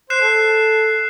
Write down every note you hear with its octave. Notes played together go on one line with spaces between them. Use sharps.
C5 F#6 C7 E7
A4